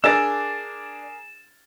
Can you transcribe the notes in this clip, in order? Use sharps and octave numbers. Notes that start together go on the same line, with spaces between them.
D4 G#4 A#4 E6 A6